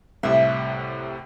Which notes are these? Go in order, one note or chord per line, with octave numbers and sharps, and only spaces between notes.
C2 A2 C3 E5